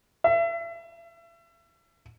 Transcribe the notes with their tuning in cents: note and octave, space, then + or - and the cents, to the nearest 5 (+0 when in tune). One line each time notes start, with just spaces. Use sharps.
E5 +35